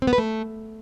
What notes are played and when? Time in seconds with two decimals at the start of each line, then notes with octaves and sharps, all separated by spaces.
0.02 C4
0.07 B3
0.13 B4
0.18 A3